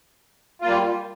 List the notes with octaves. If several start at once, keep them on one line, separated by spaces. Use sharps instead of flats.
G3 A#3 F4